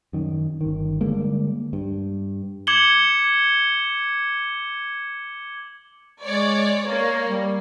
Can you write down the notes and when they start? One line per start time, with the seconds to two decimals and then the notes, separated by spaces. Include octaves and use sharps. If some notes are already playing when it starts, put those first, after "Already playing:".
0.13 F#2 D#3
0.61 G1 D#3
1.01 D3 G3 G#3 A#3
1.73 G2
2.67 D6 G#6 C#7 F#7 G7
6.24 G#3 C#5 D5
6.87 A#3 C#5
7.28 G3